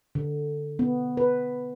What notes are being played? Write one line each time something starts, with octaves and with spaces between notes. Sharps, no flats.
D3
B3
B4